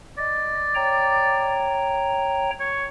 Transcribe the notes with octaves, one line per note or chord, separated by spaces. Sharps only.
D5 D#5
C#5 G5 A#5
C#5